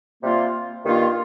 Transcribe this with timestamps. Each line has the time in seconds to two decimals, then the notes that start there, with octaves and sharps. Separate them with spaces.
0.22 C3 G3 A#3 F4
0.85 G2 D#3 A#3 F4